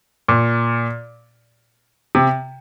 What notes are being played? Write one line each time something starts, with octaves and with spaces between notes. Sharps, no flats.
A#2
C3